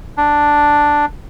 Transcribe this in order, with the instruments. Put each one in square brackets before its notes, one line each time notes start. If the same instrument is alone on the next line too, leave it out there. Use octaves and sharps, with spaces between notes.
[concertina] D4